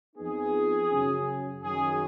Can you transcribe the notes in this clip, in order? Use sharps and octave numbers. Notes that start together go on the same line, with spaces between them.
F2 F3 B3 D#4 G#4
F#2 C#3 F#3 C#4
F#2 D#3 F#3 G#4